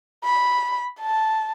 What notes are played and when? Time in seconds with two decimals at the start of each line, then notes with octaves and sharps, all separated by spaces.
0.24 B5
1.00 A5